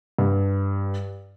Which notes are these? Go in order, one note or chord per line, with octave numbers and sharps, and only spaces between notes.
G2